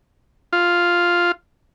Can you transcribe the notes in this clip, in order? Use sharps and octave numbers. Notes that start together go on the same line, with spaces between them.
F4